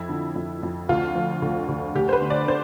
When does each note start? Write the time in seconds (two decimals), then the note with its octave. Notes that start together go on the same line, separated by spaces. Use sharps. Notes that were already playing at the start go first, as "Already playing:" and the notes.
Already playing: F2 E4
0.09 D3
0.35 F2
0.63 F2
0.89 D2 F4
1.15 F3
1.42 D2
1.68 D2
1.95 D2 G4
2.09 C5
2.13 B4
2.22 D3
2.30 D5
2.48 D3 C5